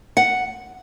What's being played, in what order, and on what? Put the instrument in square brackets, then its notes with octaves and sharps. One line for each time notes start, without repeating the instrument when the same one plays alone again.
[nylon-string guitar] F#5